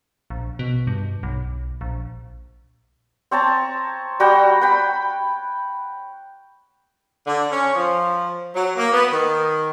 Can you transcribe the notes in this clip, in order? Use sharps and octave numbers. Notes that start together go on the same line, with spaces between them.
A#1
B2
G2
B1
A#1
C4 C#5 A5 A#5
G3 F#4 G5 A#5
F#5 G5 B5
D3
C#4
F3
F#3
A#3
B3
D#3